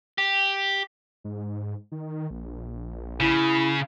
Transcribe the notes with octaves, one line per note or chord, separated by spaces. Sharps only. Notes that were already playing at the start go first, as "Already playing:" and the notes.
G4
G#2
D#3
A#1
C#3 E4